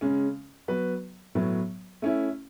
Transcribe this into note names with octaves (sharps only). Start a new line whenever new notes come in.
C#3 G#3 C#4
F#3 B3 F#4 B4
A2 F#3 B3
A3 C#4 E4